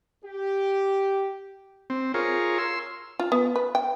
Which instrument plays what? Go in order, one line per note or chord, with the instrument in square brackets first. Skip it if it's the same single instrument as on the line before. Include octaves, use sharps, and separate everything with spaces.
[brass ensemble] G4
[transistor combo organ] C4
F4 G#4 A#4 C#5
C6 E6
[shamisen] F4
B3
B4
G5